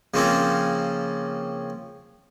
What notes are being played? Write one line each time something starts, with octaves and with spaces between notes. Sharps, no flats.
C#3 F3 A#3 C4 C#4